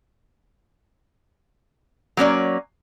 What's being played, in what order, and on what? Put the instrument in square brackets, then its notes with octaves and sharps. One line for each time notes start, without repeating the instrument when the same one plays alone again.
[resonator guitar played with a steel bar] F#3 A#3 C#4 D5